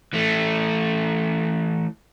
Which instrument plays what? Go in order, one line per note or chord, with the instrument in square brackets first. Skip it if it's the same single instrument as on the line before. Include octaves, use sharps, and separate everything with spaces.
[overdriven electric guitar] E3 A3